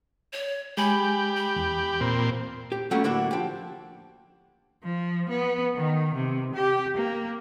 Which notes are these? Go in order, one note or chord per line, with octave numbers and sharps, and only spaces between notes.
C#5
G#3 G4 G#5 B5
B5
E2
A#2 C4
G4
F#3 G3 A3 A#3 C#4
A2 D3 A#3 D4 E4 F#4
F3 G4
F3
B3
D#3
C3
G4
A#3